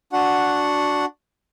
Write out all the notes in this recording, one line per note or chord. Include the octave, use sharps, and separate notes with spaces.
D4 F#4 F#5